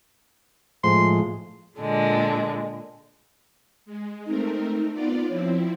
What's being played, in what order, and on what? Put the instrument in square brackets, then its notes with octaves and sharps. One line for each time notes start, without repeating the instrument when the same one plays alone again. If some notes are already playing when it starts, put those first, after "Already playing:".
[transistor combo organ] A2 F3 G#3 [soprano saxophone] C6
[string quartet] A#2 D3 G#3 D4
[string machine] G#3
[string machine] A3 C4 A#4 [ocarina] D#4
[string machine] B3 F4 D5
[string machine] F3 C4 E4 [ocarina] C#5